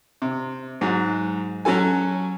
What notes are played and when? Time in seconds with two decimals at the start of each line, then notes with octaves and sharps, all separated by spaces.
0.22 C3
0.81 G#2 F#3
1.65 F#3 C#4 F#4 A4 G#5